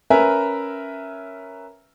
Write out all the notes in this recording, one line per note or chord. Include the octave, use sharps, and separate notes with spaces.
C#4 A#4 B4 E5 G#5 A#5